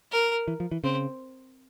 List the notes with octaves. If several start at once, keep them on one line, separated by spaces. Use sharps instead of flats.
A#4
E3
F3
E3
C#3 C4